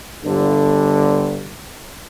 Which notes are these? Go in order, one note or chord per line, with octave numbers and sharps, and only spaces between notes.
G1 G2 D3